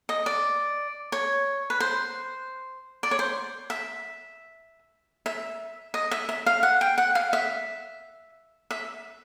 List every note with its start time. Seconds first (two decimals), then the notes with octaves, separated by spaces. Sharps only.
0.09 D#5
0.26 D5
1.12 C#5
1.70 B4
1.80 C5
3.03 D5
3.11 C#5
3.19 C5
3.70 E5
5.26 E5
5.94 D#5
6.11 E5
6.29 E5
6.46 F5
6.63 F#5
6.81 G5
6.98 F#5
7.15 F5
7.33 E5
8.71 E5